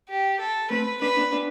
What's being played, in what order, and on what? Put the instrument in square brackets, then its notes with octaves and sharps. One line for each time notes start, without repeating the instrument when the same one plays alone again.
[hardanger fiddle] G4
A4
[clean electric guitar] A3 C4 [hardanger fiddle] B4
[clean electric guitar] B3 D4 [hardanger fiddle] B4
[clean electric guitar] B3 D4
B3 D4